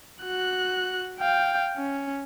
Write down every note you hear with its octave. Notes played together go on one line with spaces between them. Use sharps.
F#4 F#6
F5 G5
C#4